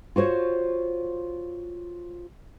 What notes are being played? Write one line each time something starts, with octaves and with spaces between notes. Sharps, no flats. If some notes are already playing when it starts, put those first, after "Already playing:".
F4 F#4 C5 C#5